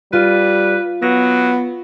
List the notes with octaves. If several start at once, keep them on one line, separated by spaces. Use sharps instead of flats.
G3 F4 B4
F#3 B3 A#6